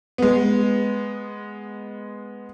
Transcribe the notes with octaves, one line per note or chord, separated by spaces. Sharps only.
G#3 B3